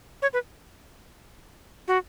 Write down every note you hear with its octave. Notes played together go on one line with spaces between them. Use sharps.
C#5
B4
F#4